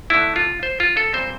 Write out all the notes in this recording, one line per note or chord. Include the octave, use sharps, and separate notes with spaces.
D3 A3 D4 E4
F4
C5
F4
A4
A#2 G3 C4 C5